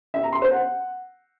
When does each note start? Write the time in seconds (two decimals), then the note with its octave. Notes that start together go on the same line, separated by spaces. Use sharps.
0.14 E5
0.23 A#5
0.33 C6
0.42 C5
0.51 F#5